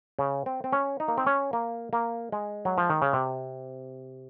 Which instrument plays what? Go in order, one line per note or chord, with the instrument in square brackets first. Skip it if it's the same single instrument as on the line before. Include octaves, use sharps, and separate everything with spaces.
[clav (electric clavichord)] C#3
C4
C4
C#4
D#4
A#3
C4
C#4
A#3
A#3
G#3
F#3
F3
D#3
C#3
C3